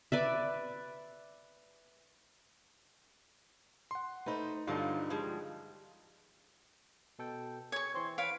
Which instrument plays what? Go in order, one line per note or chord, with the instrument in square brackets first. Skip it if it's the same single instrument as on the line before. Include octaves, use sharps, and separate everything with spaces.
[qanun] B4 D5 E5
[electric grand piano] F#5 C6
[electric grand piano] A3 D#4 [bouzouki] B4 C5
[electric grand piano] G2 D3 D#4 [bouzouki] F3 F#3 F4
[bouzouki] F3 G3 G#3
[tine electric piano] B2 A4 G5
[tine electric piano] G#4 [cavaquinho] C#5 C#6 [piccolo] G#6
[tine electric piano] E3 C4 [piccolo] C6
[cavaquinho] B4 C#5 F5 [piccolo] D7